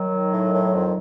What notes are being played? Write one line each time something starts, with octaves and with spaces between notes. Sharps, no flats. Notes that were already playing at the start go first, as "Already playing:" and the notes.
Already playing: D#3 F#3
A2
A2
F2